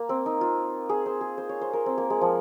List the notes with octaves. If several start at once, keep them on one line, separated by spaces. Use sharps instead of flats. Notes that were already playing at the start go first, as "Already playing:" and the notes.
Already playing: A#3
C4
D#4
F4
G#4
C5
G#4
C5
C#5
C5
A#4
C4
A#3
G#3
F3